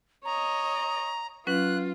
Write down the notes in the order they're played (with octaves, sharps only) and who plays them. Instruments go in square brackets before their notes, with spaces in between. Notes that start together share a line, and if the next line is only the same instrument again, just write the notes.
[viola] C#5 D#5 [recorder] A#5
[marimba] F#3 C#4 B4 [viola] F4 [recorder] F#6